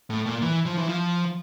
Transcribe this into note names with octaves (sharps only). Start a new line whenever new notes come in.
A2
A#2
E3
F3
E3
F3